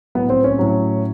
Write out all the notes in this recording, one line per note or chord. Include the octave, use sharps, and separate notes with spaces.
A2 F#3 B3
C4
C#4
A2 F#3